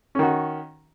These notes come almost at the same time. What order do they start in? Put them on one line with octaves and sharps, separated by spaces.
C#4 D#3 F#4